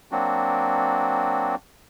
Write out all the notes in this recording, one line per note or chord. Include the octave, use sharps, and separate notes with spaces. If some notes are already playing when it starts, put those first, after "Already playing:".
F#3 A#3 C4 D4 F#4